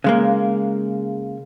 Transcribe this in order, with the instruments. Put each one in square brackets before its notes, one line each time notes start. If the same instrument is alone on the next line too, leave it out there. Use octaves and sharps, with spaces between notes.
[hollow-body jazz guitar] C#3 G#3 A#3